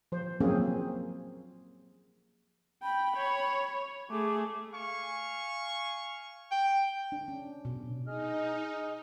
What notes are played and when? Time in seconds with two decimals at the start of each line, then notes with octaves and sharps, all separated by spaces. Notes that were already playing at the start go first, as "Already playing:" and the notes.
0.12 F3 C5
0.40 F3 F#3 A#3 C4 C#4 G#4
2.83 G5 B5
3.17 C#5
4.10 A3 G#4 D6
4.73 F5 G#5 C#6
6.51 G5
7.12 D4
7.28 C#4
7.65 B2
8.07 D#4 G#4 D#5 F6